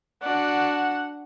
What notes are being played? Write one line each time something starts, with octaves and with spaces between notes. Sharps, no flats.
D4 F#4 F#5